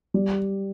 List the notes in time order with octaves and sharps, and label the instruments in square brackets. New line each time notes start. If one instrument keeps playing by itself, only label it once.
[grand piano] G3